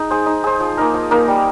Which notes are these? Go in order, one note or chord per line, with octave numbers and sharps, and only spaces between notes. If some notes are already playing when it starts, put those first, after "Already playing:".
Already playing: G#3 D#4
G#4 C5
D#4
G#4 C5
F3
A#3 D#4 A#4
F3
A#3 D#4 A#4
G3